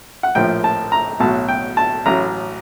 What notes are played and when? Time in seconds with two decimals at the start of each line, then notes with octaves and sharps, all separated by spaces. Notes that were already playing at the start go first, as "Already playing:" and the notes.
0.23 F#5
0.35 A#1 A2 F3 G5
0.64 A5
0.92 A#5
1.20 B1 A2 F#3 A5
1.48 G5
1.77 A5
2.06 A1 A2 F#3 A#5